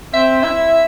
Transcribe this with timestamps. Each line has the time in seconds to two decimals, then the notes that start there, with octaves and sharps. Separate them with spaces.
0.13 C4 E5
0.42 E4 E5